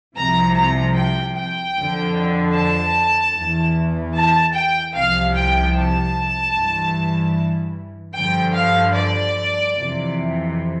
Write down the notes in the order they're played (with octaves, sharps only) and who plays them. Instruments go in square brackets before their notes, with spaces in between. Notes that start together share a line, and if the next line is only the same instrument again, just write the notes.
[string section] C2 C3 F3 A#5
A#5
G5
G5
F2 D3 F3
A5
E2 E3
A5
G5
C2 C3 F3 F5
G5
A5
G2 E3
G2 D3 F3 G5
F5
D5
F2 C3 E3